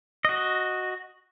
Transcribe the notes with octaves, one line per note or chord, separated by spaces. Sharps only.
F#4 D#5